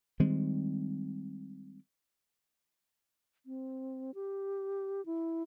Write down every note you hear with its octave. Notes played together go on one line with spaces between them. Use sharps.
D#3 G3 G#3 C4
C4
G4
E4